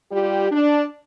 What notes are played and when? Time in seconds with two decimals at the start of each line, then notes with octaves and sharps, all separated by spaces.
0.11 G3 F4 G4
0.51 D4